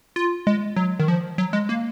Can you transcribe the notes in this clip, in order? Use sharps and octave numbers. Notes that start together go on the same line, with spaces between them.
F4
G#3
F#3
D#3
F3
F#3
G#3
A#3